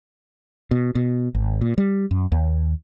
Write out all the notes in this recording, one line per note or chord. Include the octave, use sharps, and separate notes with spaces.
B2
B2
G#1
A#2
G3
F#2
D#2